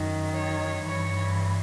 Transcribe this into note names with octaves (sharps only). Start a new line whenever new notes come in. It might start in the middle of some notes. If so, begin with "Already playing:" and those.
Already playing: F#2 D#3
C#5
G2 E3 C#5